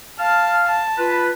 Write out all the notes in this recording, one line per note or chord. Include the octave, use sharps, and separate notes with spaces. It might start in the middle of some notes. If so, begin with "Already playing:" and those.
F5 A5 F6
A5
F4 B4